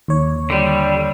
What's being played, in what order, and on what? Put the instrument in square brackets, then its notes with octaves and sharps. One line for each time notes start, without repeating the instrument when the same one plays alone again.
[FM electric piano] D#2 C#5
[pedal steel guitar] D3 G3